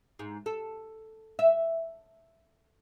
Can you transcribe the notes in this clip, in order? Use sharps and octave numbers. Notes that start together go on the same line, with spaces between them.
G#2
A4
E5